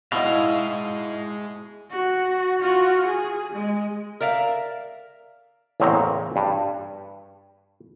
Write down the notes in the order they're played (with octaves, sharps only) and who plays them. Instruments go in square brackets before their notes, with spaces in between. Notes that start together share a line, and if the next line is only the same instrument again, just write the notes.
[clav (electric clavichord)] B2 [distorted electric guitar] G#3 C5 [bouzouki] E4 D#5 [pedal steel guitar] F5
[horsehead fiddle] F#4
F4 F#4
G#4
G#3
[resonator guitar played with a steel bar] A#4 D5 E5 F5
[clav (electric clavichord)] A1 E2 C#3 A#3 C4 A#5
G2